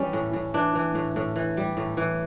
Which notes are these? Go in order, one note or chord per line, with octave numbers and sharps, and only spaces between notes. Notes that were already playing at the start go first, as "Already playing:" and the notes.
Already playing: E3 G3 C#4
A2
A2
E3 D4
E3
A2
A2
E3
G3
A2
E3